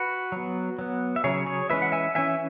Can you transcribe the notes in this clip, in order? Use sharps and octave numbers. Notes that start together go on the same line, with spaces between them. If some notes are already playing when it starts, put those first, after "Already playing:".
Already playing: F#4 B4
F#3 B3
F#3 B3
E5
C#3 F#3 C#4 G#4 C#5
G#4 C#5
E3 G#3 C#4 B4 E5
F#5
E5 G#5
E3 C#4 E5 G#5